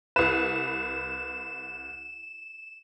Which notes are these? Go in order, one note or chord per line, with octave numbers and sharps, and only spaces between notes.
C2 B4 E7